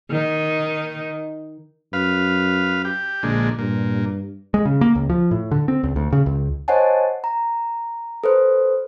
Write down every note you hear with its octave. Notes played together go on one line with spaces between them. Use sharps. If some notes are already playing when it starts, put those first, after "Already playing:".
D#3 D#4
F#2 B4 F5
G4
A#1 A#2 D3 G#3
G2 A#2
G#3
C#3
A#3
C#2
F3
A2
D3
C4
C#2
D2
C#3
C#2
C5 C#5 D#5 F#5 G#5 A5
A#5
A4 B4 C5